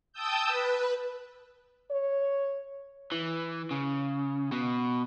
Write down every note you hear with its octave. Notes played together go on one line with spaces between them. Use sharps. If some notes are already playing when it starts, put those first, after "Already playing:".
G5 A5 D#6 E6 G6
B4
C#5
E3
C#3
B2